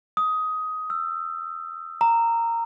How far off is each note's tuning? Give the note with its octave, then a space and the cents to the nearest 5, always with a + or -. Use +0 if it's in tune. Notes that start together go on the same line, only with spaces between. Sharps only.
D#6 +15
E6 +25
A#5 -15